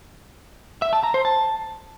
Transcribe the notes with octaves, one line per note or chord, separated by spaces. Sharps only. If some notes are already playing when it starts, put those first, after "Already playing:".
E5
A5
A#5
C5
A5